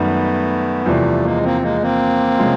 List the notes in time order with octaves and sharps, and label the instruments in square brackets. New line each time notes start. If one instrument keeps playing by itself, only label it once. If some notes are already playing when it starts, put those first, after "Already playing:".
Already playing: [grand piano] F#2 D#3 G3 [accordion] A3 B3
[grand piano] E2 C3 F3 [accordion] G3 A3
[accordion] G#3 A#3
A#3 C4
G#3 A#3
A#3 C4
[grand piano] C3 F3 G#3 C#4